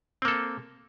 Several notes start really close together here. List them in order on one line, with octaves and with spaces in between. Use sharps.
C4 A#3 A4